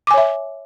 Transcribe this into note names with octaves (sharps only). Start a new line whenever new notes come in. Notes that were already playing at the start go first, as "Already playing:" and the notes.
C#5 E5 G#5 D6